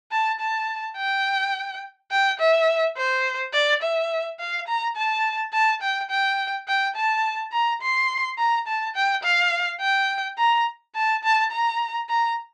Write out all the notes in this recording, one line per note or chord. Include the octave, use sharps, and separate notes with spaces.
A5
A5
G5
G5
E5
C5
D5
E5
F5
A#5
A5
A5
G5
G5
G5
A5
A#5
C6
A#5
A5
G5
F5
G5
A#5
A5
A5
A#5
A#5